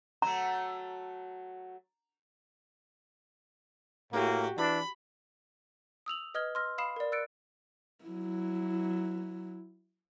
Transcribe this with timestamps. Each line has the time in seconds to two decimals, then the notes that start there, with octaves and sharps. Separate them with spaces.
0.22 F#3 A3 A#5
4.13 A2 A#3 F#4 G4
4.58 E3 D4 B5
6.06 D#6 E6 F7 F#7
6.34 B4 D#5 D#6 F6 G#6 G7
6.55 C6 E6 F6 A#6
6.78 F5 B5 D#6 C7 E7
6.96 A#4 D5
7.12 E6 F#6 A6 C#7 D7
8.05 F#3 E4